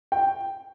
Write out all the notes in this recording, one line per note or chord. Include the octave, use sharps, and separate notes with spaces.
G5